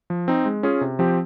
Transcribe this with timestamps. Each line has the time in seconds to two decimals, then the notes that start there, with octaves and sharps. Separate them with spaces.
0.10 F3
0.28 C4 D#4
0.45 G#3
0.63 C#4 F4 G#4
0.81 C3
0.99 F3 C4 G4